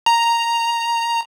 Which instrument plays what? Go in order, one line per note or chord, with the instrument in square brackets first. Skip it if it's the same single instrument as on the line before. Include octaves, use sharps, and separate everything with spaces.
[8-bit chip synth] A#5